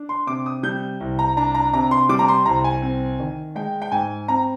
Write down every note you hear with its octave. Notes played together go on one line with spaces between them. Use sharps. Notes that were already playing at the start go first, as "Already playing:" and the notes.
Already playing: D4
C6
C3 D6
D#6
G3 G6
C2
A#5
D4 A#5
A#5
C3 A#5
C6
G3 D6
A#5
C6
C2 A#5
G#5
C4
D#3
G#3 G5
G5
G#2 G#5
C4 A#5